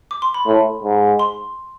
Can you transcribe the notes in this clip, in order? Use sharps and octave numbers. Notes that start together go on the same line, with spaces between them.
D6
C6
B5
A2
G#2
C6